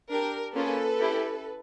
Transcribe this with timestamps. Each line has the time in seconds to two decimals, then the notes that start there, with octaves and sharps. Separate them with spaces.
0.10 D4 G4 A#4
0.54 A#3 C#4 F4 G#4 A4 B4
0.99 C#4 E4 G4